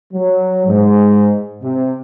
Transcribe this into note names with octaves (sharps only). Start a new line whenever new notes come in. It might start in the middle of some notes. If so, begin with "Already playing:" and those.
F#3
G#2
C3